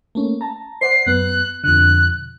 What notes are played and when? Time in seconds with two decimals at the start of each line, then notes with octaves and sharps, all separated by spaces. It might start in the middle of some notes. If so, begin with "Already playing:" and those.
0.15 A3 A#3 C#4
0.41 A5 A#5
0.81 C5 D5 F#5 C7
1.06 F#2 B3 F#6
1.64 F2 B2 D3 F#6